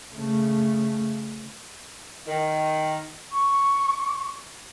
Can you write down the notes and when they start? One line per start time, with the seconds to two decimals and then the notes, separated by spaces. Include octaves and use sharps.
0.14 C#3 A3
2.26 D#3
3.31 C#6